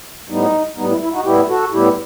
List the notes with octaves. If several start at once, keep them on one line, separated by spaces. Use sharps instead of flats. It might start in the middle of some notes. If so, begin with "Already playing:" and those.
A2 G3 B3 D#4
A2 G3 B3 D#4
E4
E4
D#4 F#4
A2 G3 B3 E4 G4
F#4 A4
A2 G3 B3 E4 G4